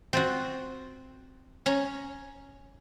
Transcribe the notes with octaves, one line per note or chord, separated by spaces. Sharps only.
C4 F4 F#4
C#4 C#5 A#5